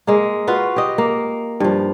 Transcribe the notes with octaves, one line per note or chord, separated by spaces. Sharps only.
G#3 A#3
F4 F#4 B4
G4 D#5
A#3
G2 F3